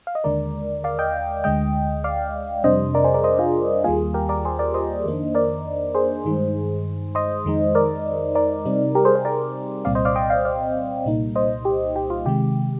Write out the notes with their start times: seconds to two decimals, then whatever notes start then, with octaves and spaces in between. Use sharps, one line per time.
0.07 F5
0.15 D#5
0.24 D#2 D3 G#3 A#4 D5
0.84 D5 F5
0.99 D#5 G5
1.44 D2 D3 G#3 D#5 G5
2.04 D5 F5
2.64 F2 C3 G3 D4 C5 D#5
2.95 A#4 D5
3.04 G#4 C5
3.14 A#4 D5
3.24 C5 D#5
3.39 F4 G#4
3.84 D#2 D#3 G3 A#3 F4 G#4
4.14 G4 A#4
4.29 A#4 D5
4.45 G#4 C5
4.59 A#4 D5
4.74 C5 D#5
5.05 F2 D#3 A#3 D4
5.35 A#4 D5
5.95 G#4 C5
6.25 G2 D#3 G#3 D#4
7.15 C5 D#5
7.45 F2 D#3 G#3 D#4
7.75 A#4 D5
8.35 A#4 D5
8.65 C3 G3 C4 D#4
8.95 G4 A#4
9.05 G#4 C5
9.15 G#4 C5
9.25 A#4 D5
9.85 C2 A#2 G3 C4 D5 F5
9.95 C5 D#5
10.05 D5 F5
10.16 D#5 G5
10.30 D5 F5
10.45 D5 F5
11.06 C2 A#2 G3 A#3 D#4
11.36 C5 D#5
11.65 G4
11.96 G4
12.10 F4
12.26 C3 D#3 G#3 G4